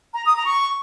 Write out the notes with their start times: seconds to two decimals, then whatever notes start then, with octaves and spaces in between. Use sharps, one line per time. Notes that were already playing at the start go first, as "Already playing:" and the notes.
0.14 A#5
0.25 D#6
0.36 A#5
0.47 C#6